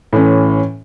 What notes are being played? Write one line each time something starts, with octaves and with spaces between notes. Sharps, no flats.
A2 E3 C#4